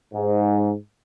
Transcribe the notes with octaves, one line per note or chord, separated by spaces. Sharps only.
G#2